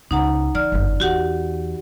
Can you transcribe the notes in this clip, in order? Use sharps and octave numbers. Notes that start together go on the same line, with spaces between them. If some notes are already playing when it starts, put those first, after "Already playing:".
C#2 D#4 F#5 A#5
E3 D5 F6
G1 F#2
E2 F#4 G4 F#5